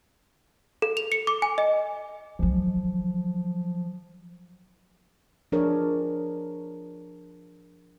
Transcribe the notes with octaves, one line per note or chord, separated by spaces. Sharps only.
A4
F7
C#7
D6
G#5
D#5
D#3 F3 F#3
F3 D4 G#4 A#4 C#5